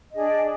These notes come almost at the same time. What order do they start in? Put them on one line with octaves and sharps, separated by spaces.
D#5 D4 G#4 D5